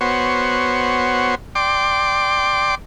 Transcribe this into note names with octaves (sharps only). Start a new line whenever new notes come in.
B3 F#4 C5 C#5
D5 G5 C6 D6